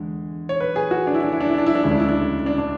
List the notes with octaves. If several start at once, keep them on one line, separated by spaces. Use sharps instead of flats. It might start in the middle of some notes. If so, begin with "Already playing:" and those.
Already playing: E2 D3 G#3
C#5
B4
G#4
F#4
D4
E4
D4
E4
D4
E4
D4
E4
D4
D2 C#3 G#3 E4
D4
E4
D4
D4
D4